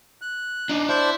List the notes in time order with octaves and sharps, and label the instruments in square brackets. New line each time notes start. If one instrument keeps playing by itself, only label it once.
[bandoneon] F#6
[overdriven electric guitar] D4 D#4
[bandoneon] D4 C5 [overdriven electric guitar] E4